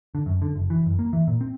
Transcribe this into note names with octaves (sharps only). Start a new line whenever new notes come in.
D3
F#2
D3
F#1
E3
F#2
A#3
E3
A#2
C4